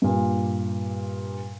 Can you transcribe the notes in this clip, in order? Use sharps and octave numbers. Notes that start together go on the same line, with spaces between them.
G2 A#2